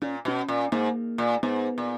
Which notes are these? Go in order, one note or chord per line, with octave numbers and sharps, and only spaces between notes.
A#2 C#4
B2 C#4
A#2
G#2 A#3
A#2
G#2 B3
A#2